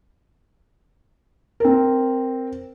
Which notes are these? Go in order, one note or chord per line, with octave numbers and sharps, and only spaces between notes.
C4 A#4